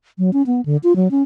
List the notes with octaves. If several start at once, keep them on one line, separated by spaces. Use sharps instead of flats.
F#3
C#4
B3
D3
F4
F#3
C#4